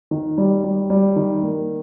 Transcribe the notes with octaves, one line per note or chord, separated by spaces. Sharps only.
D#3
G3
G3
G3
D#3
A#3